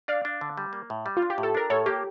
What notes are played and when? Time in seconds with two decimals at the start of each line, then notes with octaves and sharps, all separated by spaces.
0.08 D4 D5 F5
0.25 D4
0.41 D3
0.58 G3
0.73 A#3
0.90 A2
1.06 G3
1.17 F4
1.22 D4
1.30 G4
1.38 A2
1.43 A4
1.55 D4 A#4
1.70 A2 A4 C#5
1.86 A#3 G4